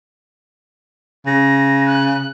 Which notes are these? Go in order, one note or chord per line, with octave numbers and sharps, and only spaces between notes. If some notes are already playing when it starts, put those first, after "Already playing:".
C#3 A#6
F#6